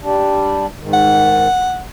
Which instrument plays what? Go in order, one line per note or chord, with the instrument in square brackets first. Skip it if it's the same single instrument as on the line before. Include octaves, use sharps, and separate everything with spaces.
[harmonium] G3 D4
G#2 D#3
[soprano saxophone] F#5